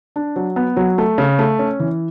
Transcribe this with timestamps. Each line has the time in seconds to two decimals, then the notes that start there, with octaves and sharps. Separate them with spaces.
0.16 D4
0.36 F#3
0.56 B3
0.77 F#3
0.98 A3
1.18 C#3
1.39 A3
1.59 C#4
1.80 E3